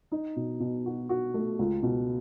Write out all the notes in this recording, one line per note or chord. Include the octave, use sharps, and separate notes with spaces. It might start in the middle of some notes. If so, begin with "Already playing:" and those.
D#4
B2
B2
F#4
F#4
A3
C#2
B2